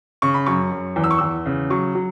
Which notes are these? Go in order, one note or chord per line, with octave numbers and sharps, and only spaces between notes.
C#3 C#6
B5
F#2 C#6
F#2
E2
E6
C#6
E2 E6
C#3
F#3 C#6
F#3